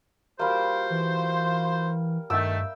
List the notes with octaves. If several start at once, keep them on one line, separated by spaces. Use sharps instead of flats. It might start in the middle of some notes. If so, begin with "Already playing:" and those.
G3 A#3 F4 F#4 C5
E3
G2 D#3 A3 E5 G5 E6